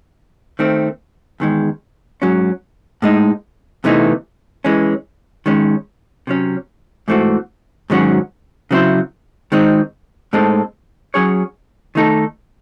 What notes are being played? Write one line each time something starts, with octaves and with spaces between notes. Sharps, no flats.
D#3 A3 C4
E2 D#3 G#3
G#2 F#3 C#4
A2 G#3 D#4
E2 C3 E3 A3 D#4
E3 G#3 C#4
D#3 G#3 C#4
C3 F#3 C#4
G#2 E3 A3 C4 F#4
G#2 D#3 F#3 C#4 F#4
C#3 F#3 C4 E4 C5
D#3 G#3 C4 D#4
A2 G#3 C4 D#4 A4
F#3 C#4 G#4 C#5
D#3 A3 D#4 A4